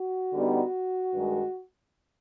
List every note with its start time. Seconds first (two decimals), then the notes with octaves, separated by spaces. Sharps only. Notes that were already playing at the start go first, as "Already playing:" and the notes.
Already playing: F#4
0.32 D3 G3 B3 D#4
1.12 G2 D#3 G#3